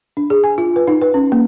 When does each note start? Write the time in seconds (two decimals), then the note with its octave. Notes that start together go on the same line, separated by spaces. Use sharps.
0.17 D4
0.30 G#4
0.44 G#5
0.58 F4
0.76 B4
0.88 D#4
1.02 B4
1.14 C#4
1.32 A#3